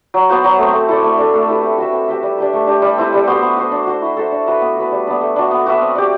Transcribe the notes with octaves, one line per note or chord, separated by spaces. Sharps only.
F#3
B3 F#4 C5
F#3
A3 C4
A3
E4 A4 D5
A3
D4 A4
A3
E4 G4 B4
C4
F#4 B4 E5
C4
G4 B4 E5
G3
D4 G4 B4
A3
D4 G4
G3
C4 E4 B4
G3
B3 F#4 C5
B3
F#4 C5
D4
F#4 C5
E4
A4 C5 E5
D4
F#4 B4 E5
B3
F#4 B4
G3
B3 D4
A3
D4 F#4
B3
F#4 B4 E5
C4
G4 D5